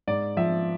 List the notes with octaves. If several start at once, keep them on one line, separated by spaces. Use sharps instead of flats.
G#2 D5
F3 E5